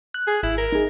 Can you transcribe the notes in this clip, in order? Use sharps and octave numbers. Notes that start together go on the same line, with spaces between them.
F#6
G#4
G#1 E4
A#4
D#4 G#4